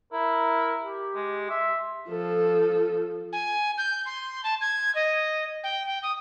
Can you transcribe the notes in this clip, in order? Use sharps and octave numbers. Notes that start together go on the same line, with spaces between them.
E4 A#4
G4
G#3
E5 C6
F3 A4
G#5
G6
C6
A5
G#6
D#5
G5
G5
D#6